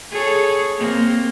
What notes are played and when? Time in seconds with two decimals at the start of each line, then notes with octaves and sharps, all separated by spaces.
0.11 G#4 A4 C#5
0.78 A#3 C4